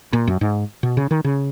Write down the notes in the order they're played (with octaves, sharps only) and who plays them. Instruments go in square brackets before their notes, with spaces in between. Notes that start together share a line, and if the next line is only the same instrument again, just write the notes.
[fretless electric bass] A#2
F#2
G#2
B2
C#3
D#3
C#3